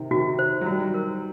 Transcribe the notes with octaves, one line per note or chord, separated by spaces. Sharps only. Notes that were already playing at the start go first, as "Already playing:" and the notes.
Already playing: C3 D#3
C3 D#3 F#4
C5
F#3
D#3 G3 F#4
A#4